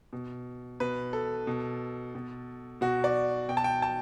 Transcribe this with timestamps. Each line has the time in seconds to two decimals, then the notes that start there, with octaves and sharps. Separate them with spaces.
0.13 B2
0.80 B2 B4
1.13 A4
1.47 B2
2.15 B2
2.81 B2 F#4
3.04 D5
3.49 B2 G5
3.57 A5
3.64 G5
3.82 A5